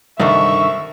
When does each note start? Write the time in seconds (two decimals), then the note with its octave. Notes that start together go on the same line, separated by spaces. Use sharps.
0.20 C2 G2 D3 D#3 E5 C#6